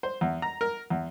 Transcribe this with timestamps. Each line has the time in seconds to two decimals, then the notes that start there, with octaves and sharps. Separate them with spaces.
0.03 C5
0.21 E2
0.42 A#5
0.61 A#4
0.90 E2